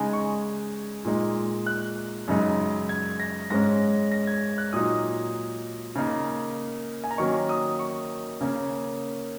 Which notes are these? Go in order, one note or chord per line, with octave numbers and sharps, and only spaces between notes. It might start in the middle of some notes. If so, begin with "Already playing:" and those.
Already playing: C#3 G#3 D#4 G#5
C#6
A#2 G#3 D#4
F#6
F#2 C#3 G#3 D#4
G#6
A#6
G#2 G#3 C#4 A#6
A#6
G#6
F#6
A#2 F#3 D#4 D#6
C#3 A#3 D#4
G#5
A#5
D#3 F#3 A#3 C#4 C#6
D#6
C#6
C#3 A#3 C#4